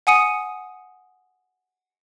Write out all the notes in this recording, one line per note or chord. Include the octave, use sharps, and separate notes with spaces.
F#5 G#5 D#6 C#7 D#7